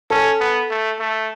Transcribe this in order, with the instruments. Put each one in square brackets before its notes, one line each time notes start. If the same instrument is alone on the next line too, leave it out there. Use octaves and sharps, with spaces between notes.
[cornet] C#4 [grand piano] A4
[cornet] B3
A3
A3